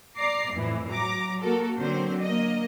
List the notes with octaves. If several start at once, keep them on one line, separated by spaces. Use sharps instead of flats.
D5 A#5 D6 C7
F2 A2 E3
F#3 A#5 D6 A#6
A#3 F#4 A4 A#4
D3 F#3 C4 C5
A#3 D#5